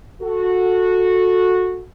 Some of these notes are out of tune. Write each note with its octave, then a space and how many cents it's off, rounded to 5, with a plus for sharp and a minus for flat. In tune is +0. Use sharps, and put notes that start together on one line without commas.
F#4 -15 A4 +5